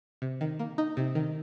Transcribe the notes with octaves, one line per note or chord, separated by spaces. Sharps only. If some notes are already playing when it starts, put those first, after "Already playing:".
C3
D#3
A#3
D#4
C3
D#3